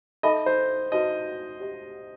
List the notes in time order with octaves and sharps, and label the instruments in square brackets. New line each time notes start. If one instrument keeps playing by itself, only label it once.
[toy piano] D#4 A4 E5 B5 [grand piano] D#5
[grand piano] C5
[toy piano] D#4 F#4 B4 [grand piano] D#5
[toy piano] G4 C5 D#5